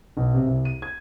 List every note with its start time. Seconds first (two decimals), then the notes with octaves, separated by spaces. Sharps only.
0.17 B1
0.34 C3
0.46 C2
0.65 D#7
0.82 G#6